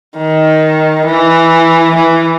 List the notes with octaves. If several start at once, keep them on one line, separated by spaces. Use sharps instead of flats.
D#3
E3
E3